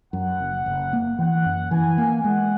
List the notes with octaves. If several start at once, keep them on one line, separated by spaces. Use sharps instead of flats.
F#2 F#5
F#1
F#1
A#3
E3 F#5
F#2
E3 G#5
A#3
G#3 F#5